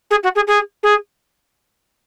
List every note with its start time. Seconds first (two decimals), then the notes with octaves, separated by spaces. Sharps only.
0.10 G#4
0.23 F#4
0.35 G#4
0.47 G#4
0.83 G#4